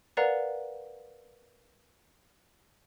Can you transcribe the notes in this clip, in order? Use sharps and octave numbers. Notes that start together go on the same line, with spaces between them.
A#4 B4 D5 F5 F#5 A#5